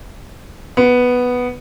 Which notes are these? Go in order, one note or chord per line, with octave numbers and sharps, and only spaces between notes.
B3